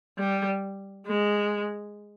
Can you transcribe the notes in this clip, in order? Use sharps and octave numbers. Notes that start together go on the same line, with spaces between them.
G3
G#3